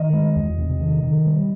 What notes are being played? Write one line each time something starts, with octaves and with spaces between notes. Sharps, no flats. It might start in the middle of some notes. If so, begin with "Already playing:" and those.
Already playing: D#3 D#5
G#3
E2
C3
D#3
D#3
G3